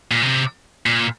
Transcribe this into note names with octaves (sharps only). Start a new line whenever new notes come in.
A#2
C3
A#2